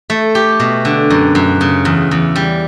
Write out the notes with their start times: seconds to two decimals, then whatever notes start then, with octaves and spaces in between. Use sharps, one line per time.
0.10 A3
0.35 G4
0.60 B2
0.85 D3
1.10 F#2
1.35 F#2
1.61 C#3
1.85 E2
2.11 E2
2.36 G3